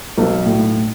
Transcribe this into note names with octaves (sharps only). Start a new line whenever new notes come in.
B1
A2